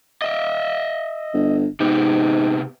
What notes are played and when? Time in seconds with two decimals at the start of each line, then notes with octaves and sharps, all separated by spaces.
0.22 D#5 E5
1.34 G1
1.80 G#2 C3 B3 G4